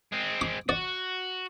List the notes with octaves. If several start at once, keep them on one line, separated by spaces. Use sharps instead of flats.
G#3 C4
D6
F#4 D5